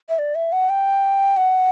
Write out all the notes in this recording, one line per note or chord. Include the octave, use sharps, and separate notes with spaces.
E5
D5
E5
F#5
G5
F#5